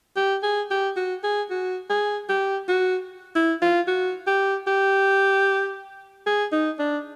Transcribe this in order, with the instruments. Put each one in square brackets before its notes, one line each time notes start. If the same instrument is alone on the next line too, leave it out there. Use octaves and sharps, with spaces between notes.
[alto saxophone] G4
G#4
G4
F#4
G#4
F#4
G#4
G4
F#4
E4
F4
F#4
G4
G4
G#4
D#4
D4